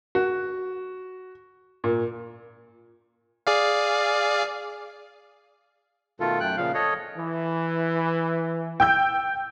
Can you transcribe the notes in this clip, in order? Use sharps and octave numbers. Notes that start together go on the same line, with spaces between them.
F#4
A#2
G#4 D5 F5
B2 D#3 A3 F4 A4
F#2 A3 G5 F#6
A#2 C#3 F3 F5
A4 C#5 D#5
E3
G5 E6 G6